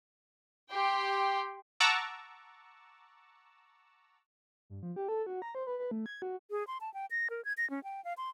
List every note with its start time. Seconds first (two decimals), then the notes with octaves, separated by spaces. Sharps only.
0.71 G4 G5 C6
1.80 F#5 A5 A#5 C#6 D6 E6
4.70 G2
4.83 F3
4.96 G4
5.08 A4
5.26 F#4
5.42 A#5
5.55 C5
5.67 B4
5.79 B4
5.91 A3
6.06 G#6
6.22 F#4
6.51 G#4
6.67 C6
6.81 A5
6.94 G5
7.11 A#6
7.30 A#4
7.45 G#6
7.57 A#6
7.70 C#4
7.84 G5
8.04 F5
8.17 C6